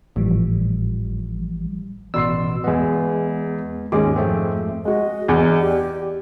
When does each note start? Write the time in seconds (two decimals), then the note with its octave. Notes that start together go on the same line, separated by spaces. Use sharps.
0.16 G#1 A2 E3 F3 G3
2.14 A1 B2 D5 C6 E6 C7
2.64 E2 G#3 B3 D#5
3.92 D#2 G#2 G#3 C#4 G#4 D6
4.16 F2 A3 C4
4.85 G#3 F#4 D#5
5.28 E2
5.61 G4 D5